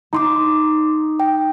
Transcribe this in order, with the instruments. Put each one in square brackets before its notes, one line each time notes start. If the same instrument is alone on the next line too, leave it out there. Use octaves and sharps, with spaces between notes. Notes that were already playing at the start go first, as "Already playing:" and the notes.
[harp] D#4 [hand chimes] A#5 C6 D6
[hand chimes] G5